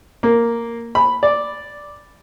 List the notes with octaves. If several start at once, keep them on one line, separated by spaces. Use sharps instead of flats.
A#3
B5
D5